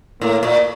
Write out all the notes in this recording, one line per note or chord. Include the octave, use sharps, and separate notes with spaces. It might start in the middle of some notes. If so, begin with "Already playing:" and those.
A2 A#3
A#2